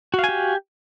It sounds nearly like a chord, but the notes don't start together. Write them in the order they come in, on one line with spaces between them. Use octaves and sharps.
F#4 F5 G#5 G4